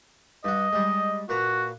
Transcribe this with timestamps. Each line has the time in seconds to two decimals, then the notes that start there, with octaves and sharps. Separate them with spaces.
0.44 G2 F#4 D#5
0.73 G3 G#3
1.29 A#2 F#4 B4 A#5